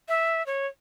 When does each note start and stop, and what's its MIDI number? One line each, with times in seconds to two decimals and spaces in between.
0.08 0.45 76
0.46 0.67 73